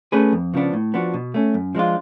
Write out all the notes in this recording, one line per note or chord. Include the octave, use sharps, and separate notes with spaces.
A3 C#4 G#4 B4
F2
C#3 F3 B3 D4
A2
F3 B3 D4 F#4
B2
A3 C#4
F#2
F3 G#3 D4 F4